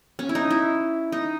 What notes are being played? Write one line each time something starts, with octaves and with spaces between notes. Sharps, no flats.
C#4
E4
D#4
E4
D#4